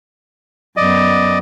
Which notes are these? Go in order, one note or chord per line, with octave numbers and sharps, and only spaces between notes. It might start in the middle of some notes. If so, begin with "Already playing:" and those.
F#2 B3 D5 D#5